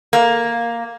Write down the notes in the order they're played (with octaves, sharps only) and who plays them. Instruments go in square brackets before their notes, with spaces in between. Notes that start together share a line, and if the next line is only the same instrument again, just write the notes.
[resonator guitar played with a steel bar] A#3